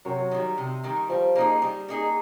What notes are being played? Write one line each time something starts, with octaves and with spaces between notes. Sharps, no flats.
C3 F#3
D#3 G3
C3
D#3 G3
F3 G3
A#3 D#4 G#4
G3
A#3 D#4 G#4